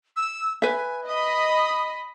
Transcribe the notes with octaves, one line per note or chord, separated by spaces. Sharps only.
E6
B4 E5 G#5
D#5 B5 D#6